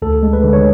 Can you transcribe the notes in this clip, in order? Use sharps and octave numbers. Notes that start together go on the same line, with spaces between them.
D2 A4
G#3
B4
D3
C#5